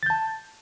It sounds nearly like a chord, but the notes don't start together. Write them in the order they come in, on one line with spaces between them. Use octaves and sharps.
A6 G6 A5